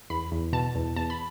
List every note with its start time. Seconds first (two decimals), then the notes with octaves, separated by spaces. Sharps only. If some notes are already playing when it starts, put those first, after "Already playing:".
0.10 E2 B5
0.32 E2
0.53 B2 A5
0.75 E2
0.96 E2 A5
1.10 B5